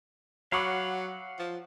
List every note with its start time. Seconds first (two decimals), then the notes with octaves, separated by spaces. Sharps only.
0.52 F#3 F5 F#5 B5 C#6 D6
1.39 F3